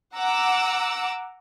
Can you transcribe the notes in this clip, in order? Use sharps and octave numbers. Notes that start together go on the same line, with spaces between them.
F#5 A#5 D6 E6